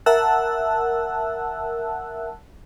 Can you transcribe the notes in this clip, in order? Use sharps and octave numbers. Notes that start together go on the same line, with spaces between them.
A#4 E5 F#5 A5 E6 F#6